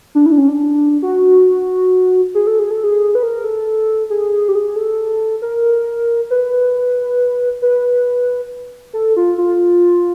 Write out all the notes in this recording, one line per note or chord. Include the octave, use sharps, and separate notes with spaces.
D4
E4
D4
C#4
D4
F#4
G#4
A4
G#4
A4
G#4
B4
A#4
A4
G#4
G4
G#4
A4
A#4
B4
B4
A4
F4
F4